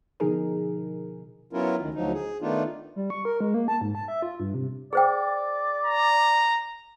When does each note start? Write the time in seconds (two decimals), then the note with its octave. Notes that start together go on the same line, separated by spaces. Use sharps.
0.20 B2 D3 F3 D#4 G#4 A#4
1.53 F#3 B3 C#4 E4 F4 A#4
1.79 D2 D#3
1.94 D2 F3 F#3 D#4
2.13 G#4
2.41 D#3 A3 B3 D4 D#4 F4
2.96 G3
3.10 C#6
3.25 A#4
3.40 G#3
3.54 A#3
3.68 A5
3.81 G#2
3.95 A5
4.08 E5
4.22 F4
4.40 G2
4.54 C3
4.93 G#4 C5 D5 G5
5.85 A#5